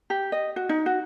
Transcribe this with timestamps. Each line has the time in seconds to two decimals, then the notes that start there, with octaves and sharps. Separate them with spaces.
0.10 G4
0.32 D#5
0.56 F#4
0.69 D#4
0.86 F#4